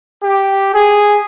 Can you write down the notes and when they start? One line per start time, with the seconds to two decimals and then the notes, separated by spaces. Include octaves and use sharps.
0.21 G4
0.73 G#4